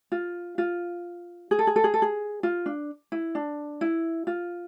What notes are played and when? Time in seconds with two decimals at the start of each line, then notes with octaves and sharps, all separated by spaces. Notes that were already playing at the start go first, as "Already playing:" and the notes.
0.12 F4
0.58 F4
1.51 G#4
1.59 A4
1.67 G#4
1.76 A4
1.84 G#4
1.94 A4
2.02 G#4
2.43 F4
2.66 D4
3.12 E4
3.35 D4
3.81 E4
4.27 F4